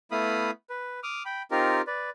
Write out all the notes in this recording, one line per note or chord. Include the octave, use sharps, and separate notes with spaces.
A3 B3 E4 F5 B5 D#6
B4
D6 D#6 F6
G5 B5
C4 D#4 F4 G4 A#4
B4 D5